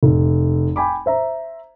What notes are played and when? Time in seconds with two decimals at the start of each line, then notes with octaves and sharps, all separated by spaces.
0.03 F1
0.76 G5 G#5 B5 D6
1.06 C5 E5 A#5